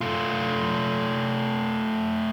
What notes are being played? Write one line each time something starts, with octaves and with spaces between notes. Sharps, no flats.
A3 F4